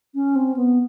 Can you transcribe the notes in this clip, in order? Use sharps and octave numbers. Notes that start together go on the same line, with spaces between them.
C#4
C4
B3